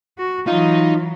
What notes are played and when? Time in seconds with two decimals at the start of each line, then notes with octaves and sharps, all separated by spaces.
0.18 F#4
0.47 E3 F#3 D#4 F4